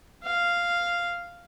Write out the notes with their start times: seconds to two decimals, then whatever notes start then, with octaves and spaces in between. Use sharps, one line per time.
0.24 F5